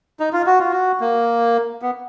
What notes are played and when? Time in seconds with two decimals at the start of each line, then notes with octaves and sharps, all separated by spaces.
0.20 D#4
0.33 F4
0.47 F#4
0.60 F4
0.72 F#4
1.01 A#3
1.82 B3